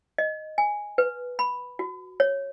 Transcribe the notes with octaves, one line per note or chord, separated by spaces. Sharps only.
D#5
G#5
B4
B5
F#4
C#5